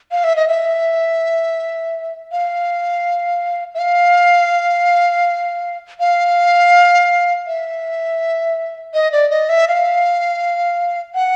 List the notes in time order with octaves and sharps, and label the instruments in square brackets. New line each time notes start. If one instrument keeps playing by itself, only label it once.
[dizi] F5
E5
D#5
E5
F5
E5
F5
F5
E5
D#5
D5
D#5
E5
F5
F#5